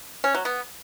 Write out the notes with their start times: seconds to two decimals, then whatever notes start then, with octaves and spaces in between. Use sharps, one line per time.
0.24 C#4
0.35 F#3
0.45 B3